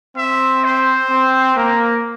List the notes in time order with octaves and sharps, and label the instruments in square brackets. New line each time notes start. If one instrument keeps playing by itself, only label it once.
[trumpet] C4 [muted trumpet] E5
[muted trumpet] C5
[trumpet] C4
[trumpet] A#3 [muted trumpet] A#4